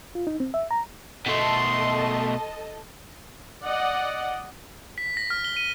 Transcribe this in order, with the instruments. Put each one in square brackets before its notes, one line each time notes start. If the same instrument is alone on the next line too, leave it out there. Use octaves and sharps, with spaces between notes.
[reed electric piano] F4
D#4
C4
E5
A#5
[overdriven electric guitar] B2 A3 [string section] A4 D#5 A5 [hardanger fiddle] C6
[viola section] D5 D#5 F#5
[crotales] B6
A#6
F6
G7
D#7